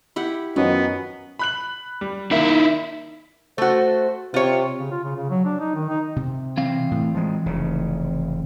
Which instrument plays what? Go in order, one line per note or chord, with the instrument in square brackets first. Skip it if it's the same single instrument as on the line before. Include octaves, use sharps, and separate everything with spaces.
[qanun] E4 G4 F#5
[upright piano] F#2 [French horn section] D#3 F3 D#5 [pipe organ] B3 [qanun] F#4
[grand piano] B5 F#6 F#7
G3
[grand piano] D#3 A#3 [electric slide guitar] D#4 E4 E5
[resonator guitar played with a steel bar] A3 F#4 [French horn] C5
[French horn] C3 [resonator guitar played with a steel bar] F4 C#5
[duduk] C#3
F4
C#3
C#3
F#3
D4
D#4
D#3
D#4
[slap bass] C3
[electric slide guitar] E3 C4 F5
[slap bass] A2
F3 G#3
F1 C#3